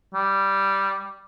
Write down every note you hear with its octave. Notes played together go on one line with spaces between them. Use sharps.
G3